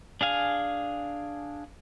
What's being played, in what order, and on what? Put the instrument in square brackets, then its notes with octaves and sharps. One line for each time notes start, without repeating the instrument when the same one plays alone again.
[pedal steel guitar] D4 G#4 F5 G#5